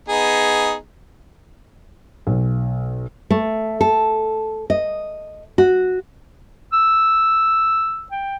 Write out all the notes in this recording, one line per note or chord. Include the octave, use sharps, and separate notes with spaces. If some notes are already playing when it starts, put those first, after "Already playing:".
B3 D#4 G#4
B1
A3
A4
D#5
F#4
E6
G5